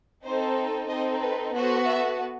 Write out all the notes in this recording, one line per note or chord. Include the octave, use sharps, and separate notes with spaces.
C4 D#4 A4 C5
C4 D#4 A4 D#5
B4
B3 F#4 A4 C5
E5